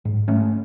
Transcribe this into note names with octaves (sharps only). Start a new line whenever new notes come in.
G#2
A3 C#4